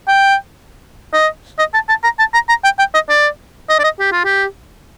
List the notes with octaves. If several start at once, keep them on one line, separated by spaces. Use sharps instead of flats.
G5
D#5
D#5
A5
A5
A#5
A5
A#5
A#5
G5
G5
D#5
D5
D#5
D5
D#5
G4
F4
G4